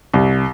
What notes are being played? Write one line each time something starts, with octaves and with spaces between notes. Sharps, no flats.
C2